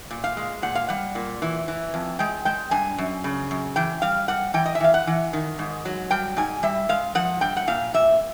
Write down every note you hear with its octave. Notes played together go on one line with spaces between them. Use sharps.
A#2
F5
G#3
A#2 F#5
F5
G3 F#5
A#2
E3
E3
F2
G#3 G5
G#3 G5
G2 G#5
F#2
C#3
F#2
E3 G5
G3 F5
G3 F#5
E3 G5
D#5
E5
E3 F5
F#5
E3
D#3
G#2
F#3
G3 G5
G#2 G#5
G3 E5
G#3 F5
F3 F#5
G2 G5
F#5
A#2 F5
A#2 E5